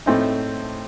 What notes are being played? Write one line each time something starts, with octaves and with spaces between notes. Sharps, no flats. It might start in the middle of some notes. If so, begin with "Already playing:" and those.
A2 A3 C4 D#4